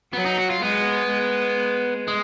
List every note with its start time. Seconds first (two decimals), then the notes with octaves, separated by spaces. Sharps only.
0.13 F#3 B3
0.26 D#4
0.38 F#4
0.50 F4
0.62 G#3 B3
1.10 G#3
2.08 G#3